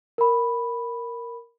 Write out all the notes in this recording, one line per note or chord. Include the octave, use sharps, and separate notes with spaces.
A#4 B5